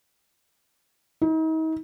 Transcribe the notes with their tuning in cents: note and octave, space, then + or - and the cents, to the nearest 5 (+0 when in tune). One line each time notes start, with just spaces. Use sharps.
D#4 +40